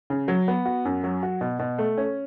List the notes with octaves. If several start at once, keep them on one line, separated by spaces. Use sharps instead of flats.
C#3
F#3
B3
F#4
F#2
F#3
F#4
B2
B2
A3
C#4